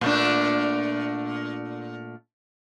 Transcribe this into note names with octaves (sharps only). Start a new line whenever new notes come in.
A#2 A3 D4